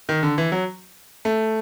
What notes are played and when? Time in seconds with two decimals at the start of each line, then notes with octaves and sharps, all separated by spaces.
0.09 D#3
0.23 D3
0.38 E3
0.52 F#3
1.25 A3